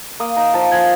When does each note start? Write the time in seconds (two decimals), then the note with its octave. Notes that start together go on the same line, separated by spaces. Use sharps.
0.20 A#3 D#6
0.36 D#4 A#5
0.54 F3 A5
0.71 F3 G#5